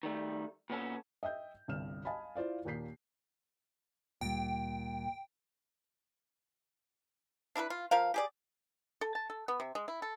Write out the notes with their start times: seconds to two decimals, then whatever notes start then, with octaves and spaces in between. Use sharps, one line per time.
0.03 D#3 G3 A3
0.70 A#2 B3 C#4 A4
1.23 D#5 E5 G5 G6
1.68 G1 C2 G2 G3 F6 E7
2.05 D#5 F5 G#5 A5 B5
2.35 E4 F4 C5 D5 F5
2.65 D#2 A#2 A#3 G6 B6 C7
4.21 D2 A#2 G3 G5
7.56 D4 E4 A#4 B4
7.70 F4
7.91 F3 A#4 F5
8.14 G4 G#4 D5
9.01 A4
9.15 A5
9.30 A4
9.48 B3
9.60 C3
9.75 G#3
9.88 E4
10.02 A4